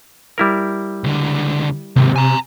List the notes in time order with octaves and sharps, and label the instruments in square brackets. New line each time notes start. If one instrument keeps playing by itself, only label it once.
[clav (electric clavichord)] G3 E4 A#4
[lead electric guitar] C#2 D3
[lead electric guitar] D#2 G#2 [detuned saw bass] C3
[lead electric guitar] G#5 A#5